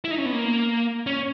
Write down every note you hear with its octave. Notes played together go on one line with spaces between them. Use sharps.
E4
D#4
C#4
B3
A#3
C#4